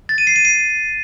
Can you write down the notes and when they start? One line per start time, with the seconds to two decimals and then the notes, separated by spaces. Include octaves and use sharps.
0.09 A6
0.18 D#7
0.27 C7
0.36 D#7
0.45 C7